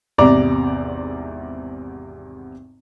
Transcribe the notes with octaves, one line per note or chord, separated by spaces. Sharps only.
G#1 E2 C3 D5 A#5 D6